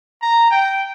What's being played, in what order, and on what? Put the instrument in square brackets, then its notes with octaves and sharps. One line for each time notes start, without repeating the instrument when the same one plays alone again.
[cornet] A#5
G5